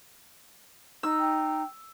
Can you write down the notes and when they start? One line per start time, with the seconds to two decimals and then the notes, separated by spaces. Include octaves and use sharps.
1.03 D#4 E6
1.20 G5